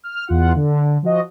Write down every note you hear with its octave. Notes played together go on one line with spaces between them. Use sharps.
F6
E2 F4 F#5
D3
F3 F#4 D#5